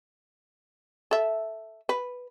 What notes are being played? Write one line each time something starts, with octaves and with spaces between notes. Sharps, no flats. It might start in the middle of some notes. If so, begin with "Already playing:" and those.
A4 E5
B4